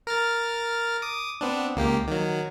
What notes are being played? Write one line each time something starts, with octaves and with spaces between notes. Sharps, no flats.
A#4 F6 A6
D6 D#6
B3 C4 D4
C#2 A#3 G4
D#3 F#3